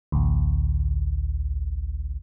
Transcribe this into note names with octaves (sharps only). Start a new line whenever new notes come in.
A1 D2